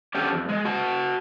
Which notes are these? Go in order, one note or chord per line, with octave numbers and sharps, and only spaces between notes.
C#4 D4 F#4 G4 A4
F2
G#3
F#4 F#5 A5